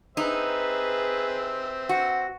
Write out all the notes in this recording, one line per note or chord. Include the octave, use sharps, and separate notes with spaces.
C4 D#4 G#4 B4 E5
F#4